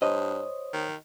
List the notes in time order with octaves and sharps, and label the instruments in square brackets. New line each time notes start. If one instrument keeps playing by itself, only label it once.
[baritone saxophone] G2 [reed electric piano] C5 C#5 D#6 [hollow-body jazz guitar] D#5
[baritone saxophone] D#3